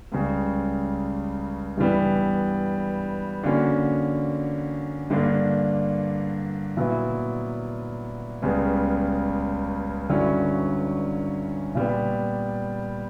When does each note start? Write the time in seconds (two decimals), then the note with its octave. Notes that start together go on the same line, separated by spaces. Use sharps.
0.12 C#2 C#3 G3
1.77 G2 E3 G3 B3
3.43 D3 A#3 C#4 F#4
5.10 G2 D3 A#3 D4
6.77 A#2 F#3 B3 E4
8.42 C#2 C#3 G3 B3
10.09 G2 D3 F#3 C#4 E4
11.75 A#2 G3 B3